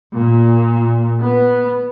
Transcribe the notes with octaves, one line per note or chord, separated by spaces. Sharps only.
A#2
B3